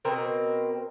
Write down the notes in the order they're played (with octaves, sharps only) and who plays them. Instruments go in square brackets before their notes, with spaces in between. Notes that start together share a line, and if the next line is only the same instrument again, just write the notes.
[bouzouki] B2 C4 A#4